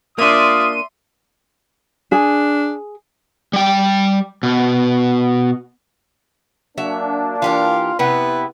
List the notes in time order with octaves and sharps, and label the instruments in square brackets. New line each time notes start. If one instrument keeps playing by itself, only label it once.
[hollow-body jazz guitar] A#3 D4 [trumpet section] F4 D#6 [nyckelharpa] D5 E5 [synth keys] C6 D#7
[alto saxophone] D4 [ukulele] G#4
[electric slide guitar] G3 G5
B2
[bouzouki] F#3 E5 [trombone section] A#3 D4
[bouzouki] E3 G4 A#4 [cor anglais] F4 [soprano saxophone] F5
[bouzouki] C3 B3 [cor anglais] E4 [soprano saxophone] B4